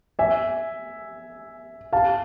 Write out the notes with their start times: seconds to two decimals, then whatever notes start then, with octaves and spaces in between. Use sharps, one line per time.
0.19 E5 G#5
1.93 F5 A5